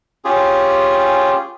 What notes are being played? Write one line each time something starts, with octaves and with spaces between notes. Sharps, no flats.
C#4 F4 G4 G#4